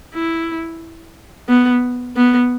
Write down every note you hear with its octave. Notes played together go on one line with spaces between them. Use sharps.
E4
B3
B3